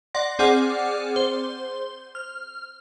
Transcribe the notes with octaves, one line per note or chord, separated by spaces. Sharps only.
D5 F#5 C6 A#6
C4 G#4 D5 F#5 D6 F6
C5
F6